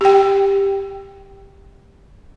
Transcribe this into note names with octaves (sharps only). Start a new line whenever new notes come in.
G4 G5